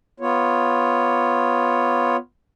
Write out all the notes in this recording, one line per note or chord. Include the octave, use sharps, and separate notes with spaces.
B3 F4 C#5